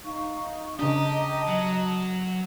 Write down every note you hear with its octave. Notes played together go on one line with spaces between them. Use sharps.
D#4 F5 C#6
C#3 D4 G4 D#5 A5 A#5 D#6
F#3